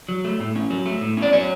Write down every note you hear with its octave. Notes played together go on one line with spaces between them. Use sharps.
F#3
A3
A2
C#4
F#3
A3
A2
C#4
D5
F#3 C#5